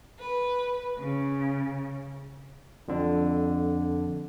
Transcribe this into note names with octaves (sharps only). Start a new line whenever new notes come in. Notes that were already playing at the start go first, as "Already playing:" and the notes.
B4
C#3
F2 D3